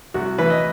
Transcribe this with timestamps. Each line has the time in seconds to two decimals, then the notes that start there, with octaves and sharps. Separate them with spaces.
0.14 C2 F#4
0.38 E3 B4
0.50 D#5